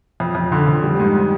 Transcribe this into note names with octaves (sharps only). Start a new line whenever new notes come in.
F2
F2
D3
F2
G3
G#2